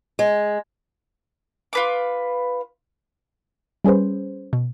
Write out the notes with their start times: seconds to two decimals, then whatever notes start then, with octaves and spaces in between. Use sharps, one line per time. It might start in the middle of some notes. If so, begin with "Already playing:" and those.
0.19 G#3
1.73 F4 B4 D6
3.84 G3 C#4 G#4 B4 C5
4.53 B2